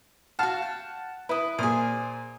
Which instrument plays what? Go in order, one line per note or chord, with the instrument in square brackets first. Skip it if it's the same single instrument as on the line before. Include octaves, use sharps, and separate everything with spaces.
[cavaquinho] F#4 F5 [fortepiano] F#5 A5 F6
[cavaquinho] G5
[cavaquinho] E4 D#6 [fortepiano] B4
[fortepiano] A#2 [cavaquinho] G#4 C5